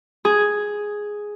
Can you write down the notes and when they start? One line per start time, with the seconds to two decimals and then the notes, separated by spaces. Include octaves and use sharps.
0.25 G#4